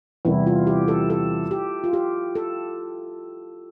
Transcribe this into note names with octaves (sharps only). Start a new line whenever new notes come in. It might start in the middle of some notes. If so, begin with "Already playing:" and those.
E2 C3 G3 E4
F4
G4
A4
A4
G4
F4
G4
A4